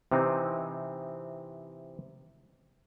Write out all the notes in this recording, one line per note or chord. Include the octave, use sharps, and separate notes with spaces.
C3 E3 C4 D#4